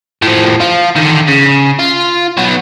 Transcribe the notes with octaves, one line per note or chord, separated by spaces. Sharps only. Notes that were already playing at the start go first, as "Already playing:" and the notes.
A2 F3
F3 F4
D3 D#3
C#3
F4
F#3 B3